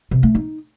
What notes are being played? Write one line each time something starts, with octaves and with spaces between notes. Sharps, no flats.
C3
A3
D#4